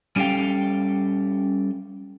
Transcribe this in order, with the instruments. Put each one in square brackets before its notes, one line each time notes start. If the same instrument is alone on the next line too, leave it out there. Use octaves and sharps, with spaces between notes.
[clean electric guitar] G3 C#4 G4 A4 F5 G5